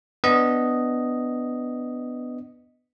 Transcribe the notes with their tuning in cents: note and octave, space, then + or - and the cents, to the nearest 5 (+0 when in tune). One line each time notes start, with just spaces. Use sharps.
B3 +10 D4 +0 D#5 +0